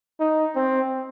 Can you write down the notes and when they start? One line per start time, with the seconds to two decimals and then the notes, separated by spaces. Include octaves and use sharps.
0.20 D#4
0.55 C4